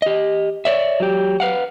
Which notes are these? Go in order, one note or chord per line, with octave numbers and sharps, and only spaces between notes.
G4 D#5
C#5 D5 E5
F#3 G4
B4 F5 F#5